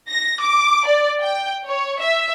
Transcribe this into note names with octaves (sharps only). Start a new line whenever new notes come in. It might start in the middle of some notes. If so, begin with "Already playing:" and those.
A#6
D6
D5
G5
C#5
E5